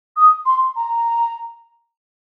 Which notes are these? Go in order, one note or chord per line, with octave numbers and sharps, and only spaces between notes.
D#6
C6
A#5